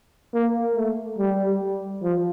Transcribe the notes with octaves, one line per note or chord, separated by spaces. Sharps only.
A#3
A3
G3
F3